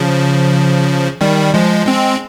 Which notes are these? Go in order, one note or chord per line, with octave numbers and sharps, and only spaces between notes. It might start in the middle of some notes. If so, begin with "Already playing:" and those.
Already playing: C#3 F3
D#3 G3
F3 G#3
G#3 C4